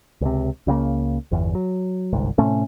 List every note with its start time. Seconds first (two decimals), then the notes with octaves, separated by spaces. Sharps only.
0.21 C#2 C3
0.67 C#2 C#3 F#3 A#3
1.31 G1 E2
1.55 F#3
2.13 G1 C2 G#2
2.38 A2 C3 A3 C#4